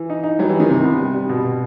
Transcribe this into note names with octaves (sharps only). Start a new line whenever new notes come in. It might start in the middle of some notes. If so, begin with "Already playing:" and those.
Already playing: E3
D#4
D#4
F#3 G3
E3
D#4
D#3
C2 C3
B3
G3
G3
B2
B2